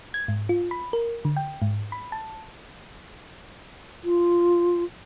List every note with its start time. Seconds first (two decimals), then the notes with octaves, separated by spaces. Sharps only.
0.14 G#6
0.28 G#2
0.49 F4
0.71 B5
0.93 A#4
1.25 D3
1.36 G5
1.62 G#2
1.92 B5
2.12 A5
4.04 F4